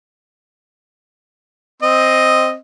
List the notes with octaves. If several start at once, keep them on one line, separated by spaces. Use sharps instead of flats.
C4 D#5